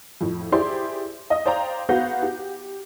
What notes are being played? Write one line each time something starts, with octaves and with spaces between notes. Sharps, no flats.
F2 A2
E4 G4 G#4 C5 D5 C6
D#5 D#6
C5 D5 F5 G5 A#5
B3 F#4 F5 F#5 G6 A#6
G4